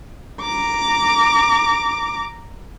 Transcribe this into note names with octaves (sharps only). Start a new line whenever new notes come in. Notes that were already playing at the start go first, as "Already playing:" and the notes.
A#5 D6